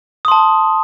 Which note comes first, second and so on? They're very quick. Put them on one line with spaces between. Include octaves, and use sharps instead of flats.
D#6 C6 A5